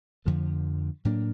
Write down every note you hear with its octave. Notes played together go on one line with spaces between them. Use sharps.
F2 D3 F3 A3
A2 F#3 A#3 D4